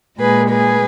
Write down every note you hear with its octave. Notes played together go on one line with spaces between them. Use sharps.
A#2 G#3 G#4 B4
G#4 B4